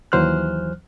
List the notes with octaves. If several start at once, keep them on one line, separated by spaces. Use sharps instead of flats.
D#2 E3 F#3 C5 F6 F#6